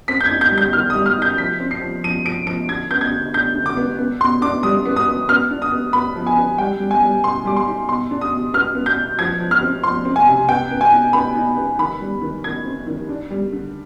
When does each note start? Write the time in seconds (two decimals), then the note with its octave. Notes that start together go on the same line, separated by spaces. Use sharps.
0.08 C4 B6
0.20 G6
0.26 G#6
0.31 D#4
0.41 G6
0.51 G3
0.58 G6
0.73 D#3 F6
0.90 G3 D#6
1.06 F6
1.17 D#4 G6
1.38 F3 B6
1.60 C4
1.71 C7
1.81 F3
2.04 F3 D#7
2.25 F3 D7
2.46 F3 D7
2.68 D3 G#6
2.91 B3 G6
3.01 G#6
3.11 D3
3.34 D3 G6
3.55 D3
3.66 D6
3.77 B3
3.99 B3
4.21 B2 C6
4.42 D4 D6
4.63 G3 D#6
4.85 B3
4.96 D#6
5.06 B3
5.29 B3 F6
5.51 D4
5.62 D#6
5.72 B3
5.93 B3 B5
6.16 F3
6.27 G#5
6.37 B3
6.58 G3 G5
6.80 G3
6.91 G#5
7.02 G3
7.24 B2 C6
7.45 G3 D6
7.56 C6
7.67 D#4
7.89 B2 C6
8.11 D4
8.21 D#6
8.32 B2
8.54 B3 F6
8.75 B3
8.86 G6
8.97 B2
9.19 F3 G#6
9.40 F3
9.51 F6
9.62 C4
9.83 F3 C6
10.05 C4
10.16 G#5
10.27 C3
10.49 B3 G5
10.71 B3
10.81 G#5
10.92 D#4
11.13 B3 B5
11.35 D#4
11.56 B3
11.79 D#3 B5
12.01 G3
12.21 D#3
12.44 D#3 G#6
12.65 C4
12.87 D#3
13.09 D4
13.31 G3
13.52 D3